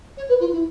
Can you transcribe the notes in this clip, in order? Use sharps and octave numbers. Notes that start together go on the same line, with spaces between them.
C#5
B4
F4
E4